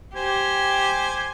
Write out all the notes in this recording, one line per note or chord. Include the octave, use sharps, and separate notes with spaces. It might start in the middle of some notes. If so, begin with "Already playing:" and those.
G4 C5 G#5